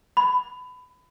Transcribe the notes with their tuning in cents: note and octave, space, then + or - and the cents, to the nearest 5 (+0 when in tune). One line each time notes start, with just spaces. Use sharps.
B5 +25